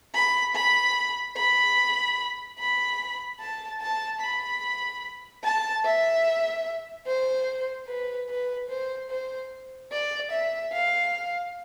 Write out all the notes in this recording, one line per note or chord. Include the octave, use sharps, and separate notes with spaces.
B5
B5
B5
B5
A5
A5
B5
A5
E5
C5
B4
B4
C5
C5
D5
E5
F5